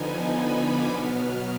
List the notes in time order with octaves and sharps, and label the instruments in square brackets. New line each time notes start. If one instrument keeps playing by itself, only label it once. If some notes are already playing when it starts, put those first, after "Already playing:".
Already playing: [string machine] D3 F3 B3 D#4 G#5
B5
D6
B2 F#3 B3 F6
F6